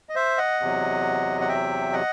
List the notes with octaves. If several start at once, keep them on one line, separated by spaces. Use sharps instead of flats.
D#5
C5 E5
D#5 F#5
E2 C3 F#3
F#5
E5 G5
D#5 F#5